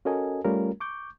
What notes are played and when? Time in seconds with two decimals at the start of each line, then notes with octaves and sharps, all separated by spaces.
0.05 C#4 F#4 A4 A#4 D#5 G#5
0.44 G3 A3 C#4 F4 G4 A#4
0.80 C#6 D6 G6